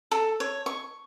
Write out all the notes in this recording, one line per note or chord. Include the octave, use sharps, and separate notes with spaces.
A4
C#5
C#6